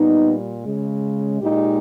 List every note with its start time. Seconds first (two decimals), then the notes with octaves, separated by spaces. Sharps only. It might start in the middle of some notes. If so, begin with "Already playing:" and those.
Already playing: A#2 G3 B3 D#4
0.64 C#3 G#3
1.41 A#2 G#3 D#4 G4